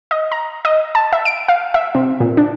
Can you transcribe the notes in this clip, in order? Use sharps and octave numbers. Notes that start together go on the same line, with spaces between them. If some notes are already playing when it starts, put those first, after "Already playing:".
D#5
A#5
D#5
A5
E5
D7
F5
E5
C3
A#2
D4